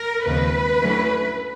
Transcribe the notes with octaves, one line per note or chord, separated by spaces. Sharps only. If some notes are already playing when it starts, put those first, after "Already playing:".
Already playing: A#4
D#2 C#3 F3 G#3 C4 B4
D3 F#3 A3 C#4 E4